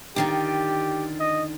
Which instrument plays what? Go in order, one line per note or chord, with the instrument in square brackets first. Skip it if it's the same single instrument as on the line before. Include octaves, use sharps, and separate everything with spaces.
[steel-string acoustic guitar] D3 D#3 F4 [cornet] G4
[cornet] D#5